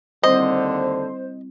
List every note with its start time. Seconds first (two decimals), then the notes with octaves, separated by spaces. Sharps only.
0.23 D#2 D3 G3 C4 E4 C5 D#5